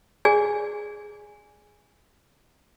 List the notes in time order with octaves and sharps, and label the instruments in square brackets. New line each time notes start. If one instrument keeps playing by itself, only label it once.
[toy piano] G#4 D5 G#5